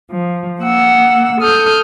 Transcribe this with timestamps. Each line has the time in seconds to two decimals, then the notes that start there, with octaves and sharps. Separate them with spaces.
0.11 F3
0.61 A#3 F#5 E6
1.41 A4 D#6 F6 G6